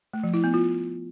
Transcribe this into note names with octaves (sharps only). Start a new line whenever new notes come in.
A3
F3
E4
B3
F4